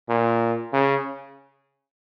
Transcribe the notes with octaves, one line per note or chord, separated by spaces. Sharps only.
A#2
C#3